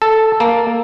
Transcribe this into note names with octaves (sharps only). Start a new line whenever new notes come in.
A4
A#3